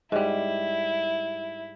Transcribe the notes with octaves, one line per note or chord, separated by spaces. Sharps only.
G#2 G3 E4